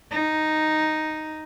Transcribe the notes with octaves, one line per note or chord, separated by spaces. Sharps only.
D#4